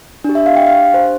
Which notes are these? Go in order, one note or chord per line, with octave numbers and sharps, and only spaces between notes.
D4 G4
E5
F5
G5
F5
C5